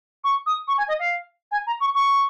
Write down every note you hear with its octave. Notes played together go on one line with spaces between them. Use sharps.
C#6
D#6
C#6
G#5
D#5
F5
G#5
A#5
C#6
C#6